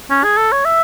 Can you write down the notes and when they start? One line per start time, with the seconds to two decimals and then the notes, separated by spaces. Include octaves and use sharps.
0.10 C#4
0.24 G#4
0.37 A4
0.52 C#5
0.65 E5